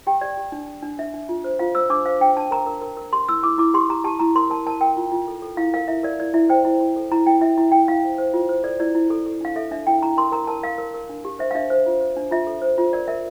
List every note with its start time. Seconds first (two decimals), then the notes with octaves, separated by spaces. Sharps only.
0.07 G4 G5
0.21 G4 D5
0.37 G4
0.52 D4
0.67 D4
0.83 D4
0.98 D4 E5
1.14 D4
1.29 F4
1.44 C5
1.59 F4 F5
1.75 C5 E6
1.90 D4 D6
2.05 C5 F5
2.21 D4 G5
2.37 D4 A5
2.51 A#4 A#5
2.66 A#4
2.82 A#4
2.97 A#4
3.13 G4 C6
3.29 E4 E6
3.43 E4 D6
3.58 E4 D6
3.74 G4 C6
3.89 G4 A#5
4.04 G4 A5
4.19 E4 A#5
4.35 A#4 C6
4.50 A#4 A5
4.66 A#4 A5
4.81 A#4 G5
4.97 F4
5.12 F4
5.27 A4
5.42 A4
5.57 E4 F5
5.74 A#4 F5
5.88 E4 E5
6.03 A#4 D5
6.20 E4 D5
6.34 E4 E5
6.49 C5 G5
6.65 E4
6.81 E4
6.96 A4
7.11 E4 A#5
7.26 E4 G5
7.41 E4 E5
7.57 E4
7.72 E4 G5
7.88 E4 F5
8.03 C5
8.18 C5
8.34 F4
8.49 C5
8.64 A4 D5
8.80 E4 D5
8.95 E4
9.10 A4
9.26 A4
9.41 D4 F5
9.56 A4 E5
9.71 D4 E5
9.87 E4 G5
10.02 E4 A#5
10.17 A#4 C6
10.32 A#4 A#5
10.47 A#4 A5
10.63 A#4 F5
10.78 A#4
10.94 A#4
11.09 D4
11.25 G4
11.39 C5 E5
11.51 F5
11.55 D4 E5
11.70 C5
11.86 F4
12.01 C5
12.16 D4
12.31 F4 E5
12.47 A4
12.62 C5
12.78 F4
12.93 A#4 D5
13.08 A#4 E5